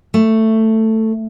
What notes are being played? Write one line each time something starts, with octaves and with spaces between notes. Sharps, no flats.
A3